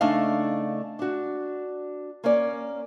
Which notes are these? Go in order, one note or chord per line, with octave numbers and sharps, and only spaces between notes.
C#3 A3 D4 D#4 D#5 F5
D4 F#4
A#3 C#4 C#5 D5